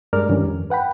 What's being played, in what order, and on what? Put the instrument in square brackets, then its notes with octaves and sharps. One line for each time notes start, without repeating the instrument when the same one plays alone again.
[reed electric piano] G2 G#3 A#4 D5 F6
G2 D#3 E3 C#4
F2
B4 F#5 G5 B5